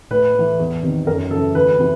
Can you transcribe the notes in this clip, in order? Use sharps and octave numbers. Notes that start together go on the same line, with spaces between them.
A2 B4
E3 A3
E2
C3 D#3
F#2 A#4
C#3 E3 A4
D2 B4
C3 E3